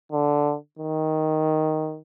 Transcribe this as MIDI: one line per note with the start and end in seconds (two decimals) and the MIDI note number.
0.12 0.55 50
0.79 1.99 51